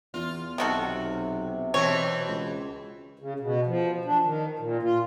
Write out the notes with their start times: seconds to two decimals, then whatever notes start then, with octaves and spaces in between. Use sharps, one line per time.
0.14 E2 F4
0.58 B1 C3 D#3 F#4 A4
1.74 B2 E3 C4 C#5
2.28 C#2
3.19 C#3
3.40 B2
3.67 F3
4.05 D4
4.23 D#3
4.59 A#2
4.83 F4